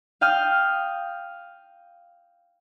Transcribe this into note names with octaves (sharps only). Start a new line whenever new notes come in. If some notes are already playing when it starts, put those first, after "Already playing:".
F5 G5 D#6 F6